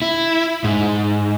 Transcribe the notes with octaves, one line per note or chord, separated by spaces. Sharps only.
E4
G#2